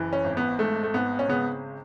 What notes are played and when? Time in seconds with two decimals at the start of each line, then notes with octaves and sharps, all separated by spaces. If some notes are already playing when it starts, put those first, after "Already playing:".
Already playing: F#1 E3
0.13 C#4
0.24 G#1
0.37 B3
0.59 G#2 A3
0.83 A3
0.94 G#1 B3
1.19 C#4
1.28 C#3 B3